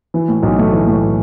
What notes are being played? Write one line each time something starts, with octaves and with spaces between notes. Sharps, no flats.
E3
A2
B1
A3
E3
A2